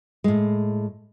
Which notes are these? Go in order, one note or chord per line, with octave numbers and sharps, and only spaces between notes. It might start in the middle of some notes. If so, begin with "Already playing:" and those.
A2 G#3